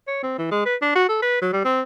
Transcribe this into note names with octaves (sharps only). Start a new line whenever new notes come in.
C#5
C4
E3
G#3
B4
D4
F#4
A4
B4
F#3
G3
C4